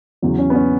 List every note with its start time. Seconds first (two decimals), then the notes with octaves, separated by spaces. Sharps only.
0.22 E2 C#3 F#3
0.39 C#4
0.50 B3
0.55 C#4